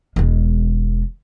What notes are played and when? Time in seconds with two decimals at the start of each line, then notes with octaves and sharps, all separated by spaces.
0.16 E1 G#3